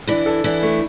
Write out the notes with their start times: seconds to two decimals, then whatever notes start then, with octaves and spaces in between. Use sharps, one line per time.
0.07 E3 D4 E4
0.26 A4
0.44 E3 D4 E4
0.63 A3